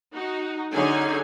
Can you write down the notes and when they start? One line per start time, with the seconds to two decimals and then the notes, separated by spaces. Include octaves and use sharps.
0.13 D#4 F#4
0.72 D3 F#3 C#4 D#4 G#4 G#5